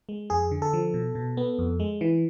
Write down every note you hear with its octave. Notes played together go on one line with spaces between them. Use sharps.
G#3
F2 G#4
D3
A4
F3
B2
B2
B3
F2
G#3
E3